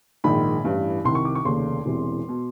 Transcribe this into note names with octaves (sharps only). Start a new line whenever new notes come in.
A#1 G#2 D#3 B5
A1 G2 E3
C2 C3 D#3 C6
C#6
D6
C#6
F1 D#2 C#3 C6
E1 E2 C3 E3
B2